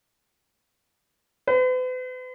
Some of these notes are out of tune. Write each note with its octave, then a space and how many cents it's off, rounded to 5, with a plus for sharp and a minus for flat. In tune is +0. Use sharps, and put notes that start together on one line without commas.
B4 +45